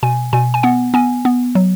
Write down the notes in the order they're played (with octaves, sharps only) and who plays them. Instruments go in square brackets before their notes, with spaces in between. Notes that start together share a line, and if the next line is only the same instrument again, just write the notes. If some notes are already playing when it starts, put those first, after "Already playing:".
[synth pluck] B2 G#5
B2 G#5
G#5
B3 F#5
B3 G#5
B3
F#3